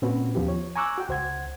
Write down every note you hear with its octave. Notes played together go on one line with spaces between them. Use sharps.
A#2 C4 C#4 F#4 B4
D#2 F3 B3 G4
C#5
G#5 A#5 C#6 D6 E6 F#6
F#4 G5
C#2 C5 F#5 G#6